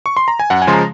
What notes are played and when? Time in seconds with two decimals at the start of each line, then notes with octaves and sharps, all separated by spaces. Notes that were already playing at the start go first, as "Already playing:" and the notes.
0.06 C#6
0.17 C6
0.28 A#5
0.40 G#5
0.50 F#2 F#5
0.62 G#5
0.67 C#3 F3 G#3 C6
0.73 A#5